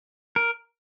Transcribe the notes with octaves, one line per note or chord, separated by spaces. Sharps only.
A#4